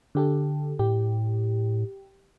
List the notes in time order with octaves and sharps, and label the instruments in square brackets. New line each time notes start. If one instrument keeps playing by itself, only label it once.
[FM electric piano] D3 G4 A4
[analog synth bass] A2 [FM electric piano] G4